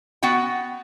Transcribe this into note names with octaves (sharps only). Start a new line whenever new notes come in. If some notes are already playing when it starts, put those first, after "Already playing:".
B3 F#4 F#5 G5